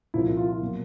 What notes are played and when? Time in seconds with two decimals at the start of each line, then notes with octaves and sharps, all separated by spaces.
0.14 C2 A#2 F3 E4
0.25 E4
0.37 F4
0.49 F4
0.61 B2 F#3 A#3